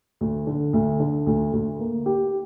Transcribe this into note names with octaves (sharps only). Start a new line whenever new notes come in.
D2
D3
D2
D3
D2
D2
A#3
G4